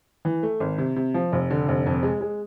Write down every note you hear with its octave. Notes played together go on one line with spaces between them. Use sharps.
E3
A3
G#1
C3
C3
F3
F1
D3
F1
F2
G#3
G#3